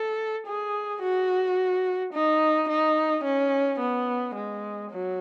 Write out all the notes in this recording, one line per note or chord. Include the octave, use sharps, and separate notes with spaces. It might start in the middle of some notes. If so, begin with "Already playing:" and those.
Already playing: A4
G#4
F#4
D#4
D#4
C#4
B3
G#3
F#3